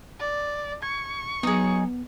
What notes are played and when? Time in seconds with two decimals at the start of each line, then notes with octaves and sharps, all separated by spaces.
0.20 D5
0.82 C#6 G#6
1.43 F#3 B3 D#4 G#4